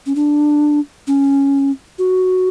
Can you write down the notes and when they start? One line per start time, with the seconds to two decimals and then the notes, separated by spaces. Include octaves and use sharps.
0.06 C#4
0.15 D4
1.07 C#4
1.99 F#4